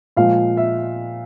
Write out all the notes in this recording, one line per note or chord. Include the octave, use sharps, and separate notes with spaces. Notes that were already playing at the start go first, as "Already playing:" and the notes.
A#2 F3 G#3 F5
E5